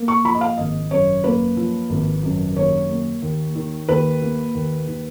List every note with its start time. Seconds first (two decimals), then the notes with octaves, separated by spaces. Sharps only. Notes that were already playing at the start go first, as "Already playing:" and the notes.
Already playing: A#3
0.08 C#6
0.24 F3 B5
0.34 D#5
0.41 F5
0.58 G#1 D#5
0.91 F#2 C#5
1.24 A#3 B4
1.57 F3
1.90 G#1
2.23 F#2
2.56 D#2 C#5
2.89 A#3
3.22 D#2
3.55 D#3
3.89 D#2 B4
4.22 A#3
4.55 D#2
4.88 D#3